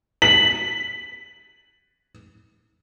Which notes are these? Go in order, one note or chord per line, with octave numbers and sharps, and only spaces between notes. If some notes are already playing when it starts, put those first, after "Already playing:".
B6 F#7